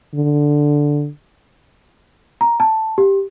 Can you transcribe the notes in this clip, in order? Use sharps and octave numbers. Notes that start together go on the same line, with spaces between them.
D3
A#5
A5
G4